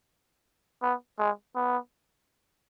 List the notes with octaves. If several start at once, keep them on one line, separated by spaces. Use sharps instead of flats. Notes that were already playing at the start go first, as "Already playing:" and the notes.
B3
G#3
B3